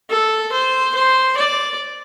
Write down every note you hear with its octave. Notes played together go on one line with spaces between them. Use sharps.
A4
C5
C5
D5